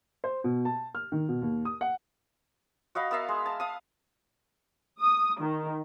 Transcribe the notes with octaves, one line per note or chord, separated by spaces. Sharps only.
C5
B2
A5
F6
D#3
B2
D#2
D#6
F#5
F#4 D#5 F5 B5
B3 A#4 E5 F5
G#3
A5
F5 D#6
D#6
D#3